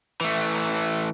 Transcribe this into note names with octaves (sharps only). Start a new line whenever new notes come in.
E3 A3